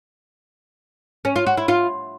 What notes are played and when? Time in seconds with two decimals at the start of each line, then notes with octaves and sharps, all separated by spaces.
1.25 C#4
1.36 F4
1.47 F#4
1.57 E4
1.68 F4